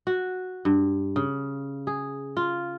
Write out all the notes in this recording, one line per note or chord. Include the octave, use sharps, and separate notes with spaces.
F#4
G2
C#3
G#4
F4